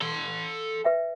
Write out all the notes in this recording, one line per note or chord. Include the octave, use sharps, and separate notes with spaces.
A4 C6
B4 E5 G5